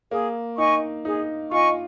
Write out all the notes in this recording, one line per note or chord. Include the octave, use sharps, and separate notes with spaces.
A#3 G#4
D#4 D#5 G#5 C#6
D#4 G#4
F4 D#5 G#5 C#6